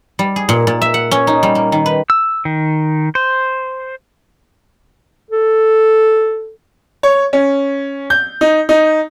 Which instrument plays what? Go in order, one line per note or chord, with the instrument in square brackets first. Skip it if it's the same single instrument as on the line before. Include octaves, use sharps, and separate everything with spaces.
[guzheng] G3
G#4
A#2
A#2
E5
F#5
C#4
D#4
G3
A#3
D#3
B4
[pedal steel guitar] E6
D#3
C5
[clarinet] A4
[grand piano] C#5
C#4
G6
D#4
D#4